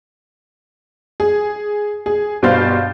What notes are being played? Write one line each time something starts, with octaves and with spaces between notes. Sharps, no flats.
G#4
G#4
G2 B2 C5 F5 G6 A6